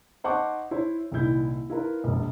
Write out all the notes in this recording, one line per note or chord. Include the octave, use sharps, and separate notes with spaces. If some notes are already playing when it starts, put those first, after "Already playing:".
D#4 C5 F#5 A5 C#6 D6
E4 C5 C#5
C2 A#2 D#3 E4 G6
E4 F4 A#4 B4
E1 A#1